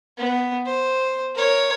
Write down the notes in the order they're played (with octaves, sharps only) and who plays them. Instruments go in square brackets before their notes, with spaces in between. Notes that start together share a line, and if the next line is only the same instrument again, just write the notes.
[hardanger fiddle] B3
C5
A#4 C#5